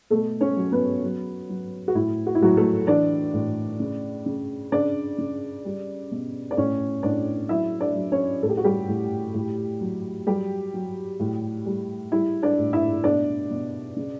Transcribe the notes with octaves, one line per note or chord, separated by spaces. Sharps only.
B2 A3 A4
C#4 C#5
F#3
B3 B4
F#3
F#3
F#4
A2 E4
F#4
E4
A2 F#3 F#4
A3 A4
E3 D4 D5
A2
C#3
C#3
C#3 D4 D5
C#3
G3
B2
D5
A2 C#4 C#5
A2 D4 D5
F#3 E4 E5
D4 D5
F#3
C#4 C#5
A2 A4
G4
F#4
G3 G4
A2
A2
F#3
F#3 G3 G4
F#3
A2
G3
G3 E4
D4 D5
A2
E4 E5
B2 D4 D5
B2
C#3